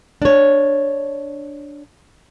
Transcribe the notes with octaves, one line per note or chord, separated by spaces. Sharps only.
D4 C#5